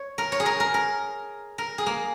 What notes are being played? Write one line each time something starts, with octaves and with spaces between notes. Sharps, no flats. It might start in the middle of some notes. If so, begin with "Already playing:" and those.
Already playing: C#5
A#4
C#5
G#4
A#4
A#4
A#4
A#4
G#4
A#3